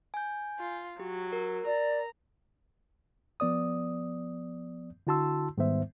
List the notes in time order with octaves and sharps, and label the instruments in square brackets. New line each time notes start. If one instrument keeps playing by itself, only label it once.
[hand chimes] G#5 G6
[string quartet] F4
[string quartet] F#3 [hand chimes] G4
[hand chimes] A#4
[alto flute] D5 [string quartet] A#5
[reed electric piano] F3 B3 D5 D#6
D3 E4 F#4 A5 C6 E6
G#2 D#3 G3 B3 C5 E5